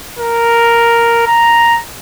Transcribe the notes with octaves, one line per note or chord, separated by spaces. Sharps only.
A#4
A#5